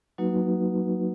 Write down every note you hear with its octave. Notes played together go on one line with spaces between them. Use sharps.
F#3 A#3 D#4 F#4 B4